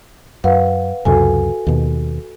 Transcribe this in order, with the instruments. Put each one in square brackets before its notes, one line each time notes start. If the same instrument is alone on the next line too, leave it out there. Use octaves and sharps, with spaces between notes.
[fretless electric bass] F#2 [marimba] B4 F5 F#5
[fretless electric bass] C#2 F#2 C3 [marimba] F#4 A4 G#5
[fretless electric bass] D#2 B2